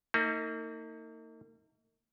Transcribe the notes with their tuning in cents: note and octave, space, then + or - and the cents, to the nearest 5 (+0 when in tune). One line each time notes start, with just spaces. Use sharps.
A#3 -40 D#4 +30